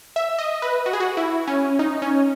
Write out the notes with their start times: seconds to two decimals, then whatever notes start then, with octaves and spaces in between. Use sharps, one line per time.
0.16 E5
0.38 D#5
0.62 B4
0.86 F#4
0.93 G#4
1.00 F#4
1.17 E4
1.47 C#4
1.79 D#4
2.02 C#4